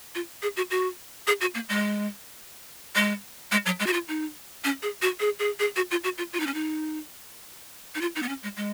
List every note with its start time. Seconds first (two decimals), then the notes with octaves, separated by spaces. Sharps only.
0.15 F4
0.42 G#4
0.57 F#4
0.71 F#4
1.27 G#4
1.41 F#4
1.55 A#3
1.69 G#3
2.95 G#3
3.52 G#3
3.66 F#3
3.80 G#3
3.86 F#4
3.93 F4
4.08 D#4
4.64 C#4
4.82 G#4
5.02 F#4
5.20 G#4
5.39 G#4
5.59 G#4
5.76 F#4
5.91 F4
6.04 F#4
6.18 F4
6.33 F4
6.40 D#4
6.47 C#4
6.54 D#4
7.95 D#4
8.01 F4
8.16 D#4
8.23 B3
8.29 C#4
8.43 G#3
8.57 G#3